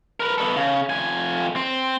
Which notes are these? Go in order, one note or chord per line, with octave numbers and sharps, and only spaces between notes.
A#4 B4
B3 A4
C#3
F2 G#5
C4